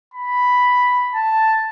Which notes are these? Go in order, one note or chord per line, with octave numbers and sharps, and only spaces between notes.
B5
A5